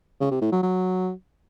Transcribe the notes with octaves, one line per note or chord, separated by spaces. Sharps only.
C#3
C3
A2
F#3
F#3